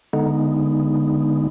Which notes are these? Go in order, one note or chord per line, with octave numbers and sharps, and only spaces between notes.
D3 G#3 B3 D#4